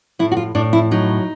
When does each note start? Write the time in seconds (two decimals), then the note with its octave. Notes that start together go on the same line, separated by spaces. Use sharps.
0.19 A2 E4
0.32 F#4
0.37 F4
0.55 A2 D4
0.73 E4
0.91 F#3 D#4